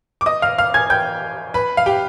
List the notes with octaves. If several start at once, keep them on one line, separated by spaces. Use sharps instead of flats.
D6
D#5 D#6
F5 F6
F5 F6
G#5 G#6
G5 G6
B4 B5
F5
G4 G5